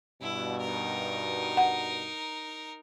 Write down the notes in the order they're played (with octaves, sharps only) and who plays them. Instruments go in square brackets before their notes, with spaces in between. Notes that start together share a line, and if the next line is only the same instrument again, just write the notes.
[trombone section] G2 B2 [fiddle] E4
[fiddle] D#4 A#4
[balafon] F#5